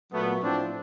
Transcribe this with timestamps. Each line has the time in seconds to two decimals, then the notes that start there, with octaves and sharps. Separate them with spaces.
0.12 A#2 F#3 A3 B3
0.41 A2 F3 C4 D4